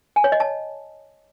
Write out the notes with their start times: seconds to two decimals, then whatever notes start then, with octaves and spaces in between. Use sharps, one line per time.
0.16 G#5
0.24 C#5
0.32 D#5
0.40 A5